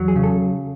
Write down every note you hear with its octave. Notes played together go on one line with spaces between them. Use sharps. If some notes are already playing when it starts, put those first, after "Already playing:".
Already playing: E2 F#3
G#4
C#3
A4